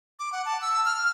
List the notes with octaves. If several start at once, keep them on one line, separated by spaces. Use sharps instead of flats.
D6
F#5
A5
E6
F6